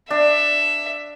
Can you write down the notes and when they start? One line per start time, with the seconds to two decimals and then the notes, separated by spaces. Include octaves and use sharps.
0.11 D4 E5